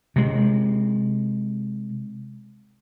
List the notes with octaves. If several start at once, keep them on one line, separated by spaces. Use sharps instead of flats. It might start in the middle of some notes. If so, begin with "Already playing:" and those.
C3 G#3